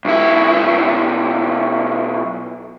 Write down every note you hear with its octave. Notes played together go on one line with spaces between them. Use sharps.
B1 E4